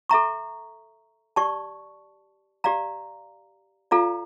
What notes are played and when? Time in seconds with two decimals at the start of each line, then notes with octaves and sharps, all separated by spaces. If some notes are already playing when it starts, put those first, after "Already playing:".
0.09 A4 E5 A#5 C#6
1.36 G4 D5 A5 C#6
2.64 G4 D5 F5 A#5
3.91 F4 A4 D5 F5 A#5